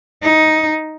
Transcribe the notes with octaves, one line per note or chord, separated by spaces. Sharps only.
D#4